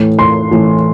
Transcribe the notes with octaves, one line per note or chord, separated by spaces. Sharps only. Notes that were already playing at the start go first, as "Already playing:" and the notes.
Already playing: A2 E3
C6
A2 E3